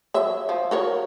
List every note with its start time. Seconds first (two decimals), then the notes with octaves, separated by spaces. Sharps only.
0.14 F#3 E5
0.49 F3
0.71 F#4 A#4 C#5